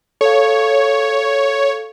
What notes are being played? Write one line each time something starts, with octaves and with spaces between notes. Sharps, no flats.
A4 C#5 F5